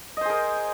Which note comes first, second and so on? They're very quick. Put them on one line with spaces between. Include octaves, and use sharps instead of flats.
D#5 C5 G#4 A#4